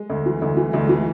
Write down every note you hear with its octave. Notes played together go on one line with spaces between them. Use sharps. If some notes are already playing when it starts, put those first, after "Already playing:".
Already playing: G#3
D2
E3
D2
E3
D2 A3
G#3
E3
A3